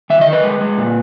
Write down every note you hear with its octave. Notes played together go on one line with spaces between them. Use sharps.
D#3 E5
D#5
D#3
B4
G#3
G#3
A#2